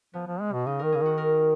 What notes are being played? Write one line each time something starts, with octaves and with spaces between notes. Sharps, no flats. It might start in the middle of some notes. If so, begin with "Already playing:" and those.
F3 B3
F3
G#3
B2
C#3 D#4
D#3 A#4
C#3 G#4
D#3 F#4
A#4